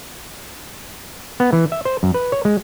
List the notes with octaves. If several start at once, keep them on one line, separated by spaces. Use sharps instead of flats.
B3
E3
E5
C5
F#2
B4
C#5
G#3